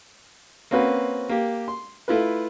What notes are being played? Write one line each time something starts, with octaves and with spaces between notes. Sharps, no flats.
A#3 C4 C#4 F#4 B4
A#3 G4
C6
A3 E4 F4 B4